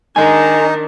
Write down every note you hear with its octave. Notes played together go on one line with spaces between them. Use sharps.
D#3 D4 D#4 D#5 G#5